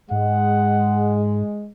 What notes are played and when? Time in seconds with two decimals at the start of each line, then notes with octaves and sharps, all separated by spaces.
0.11 G#2 G#3 F#5